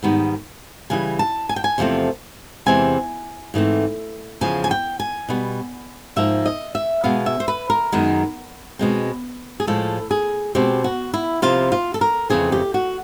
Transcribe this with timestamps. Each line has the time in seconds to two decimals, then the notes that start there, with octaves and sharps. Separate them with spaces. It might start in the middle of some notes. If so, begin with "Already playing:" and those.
0.03 G#2 D#3 G3 B3
0.90 C#3 E3 G3 G#5
1.19 A5
1.49 G#5
1.56 G5
1.64 G#5
1.78 E2 C3 F3 A3 C4
2.66 E2 C3 E3 G#3 C4 G#5
3.54 G#2 E3 A3 C4
4.41 E2 C#3 F3 G#5
4.64 G#5
4.71 G5
5.00 G#5
5.28 B2 G3 B3
6.16 G#2 F3 A#3 E5
6.46 D#5
6.75 E5
7.04 B2 G#3 B3 F5
7.26 E5
7.40 C5
7.48 B4
7.70 A#4
7.92 F#2 D#3 G#3 B3
8.79 B2 G#3 C4
9.60 G#4
9.67 A2 F3 G#3 A4
10.11 G#4
10.55 B2 G#3 C4 G4
10.84 F#4
11.14 E4
11.42 C3 F3 A#3 F4
11.72 F4
11.94 A4
12.01 A#4
12.30 F2 C#3 E3 A3 C4 G#4
12.52 G4
12.74 F#4